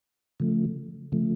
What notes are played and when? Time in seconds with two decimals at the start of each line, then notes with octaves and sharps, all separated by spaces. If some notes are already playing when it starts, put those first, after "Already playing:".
0.40 C#3 F3 A3
1.12 C#3 F3 A3